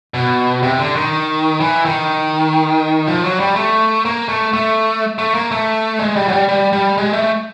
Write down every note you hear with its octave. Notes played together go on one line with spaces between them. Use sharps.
B2
C3
D3
D#3
E3
D#3
F3
F#3
G3
A3
A#3
A3
A3
A3
A#3
A3
G#3
G3
F#3
G3
G3
G3
G#3
A3